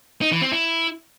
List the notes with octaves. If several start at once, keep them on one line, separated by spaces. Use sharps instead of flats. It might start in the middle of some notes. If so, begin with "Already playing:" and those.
D#4
E3
C4
E4